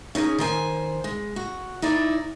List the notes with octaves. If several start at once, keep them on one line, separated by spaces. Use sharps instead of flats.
C#4 D#4 G4 G#4
D#3 C5 G#5
G#3
F#4
D#4 E4 D5